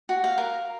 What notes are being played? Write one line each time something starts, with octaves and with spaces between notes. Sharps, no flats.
F#4
F5
A#4